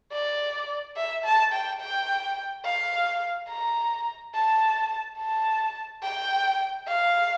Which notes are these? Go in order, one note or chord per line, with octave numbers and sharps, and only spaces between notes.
D5
E5
A5
G5
G5
F5
A#5
A5
A5
G5
F5